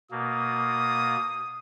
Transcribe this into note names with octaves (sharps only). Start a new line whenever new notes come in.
B2 A#3 D#6